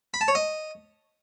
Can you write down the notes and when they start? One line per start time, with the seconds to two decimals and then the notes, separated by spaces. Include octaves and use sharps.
0.14 B5
0.21 A5
0.28 C#5
0.35 D#5